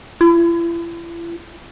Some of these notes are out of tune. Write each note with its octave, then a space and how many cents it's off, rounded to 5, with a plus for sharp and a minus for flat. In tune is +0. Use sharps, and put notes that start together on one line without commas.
E4 +45